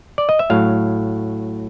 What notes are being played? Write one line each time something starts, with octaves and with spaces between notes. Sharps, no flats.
D5
D#5
E5
A2 F#3 F5